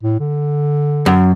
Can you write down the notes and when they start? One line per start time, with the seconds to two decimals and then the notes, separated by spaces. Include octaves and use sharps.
0.03 A2
0.20 D3
1.06 F#2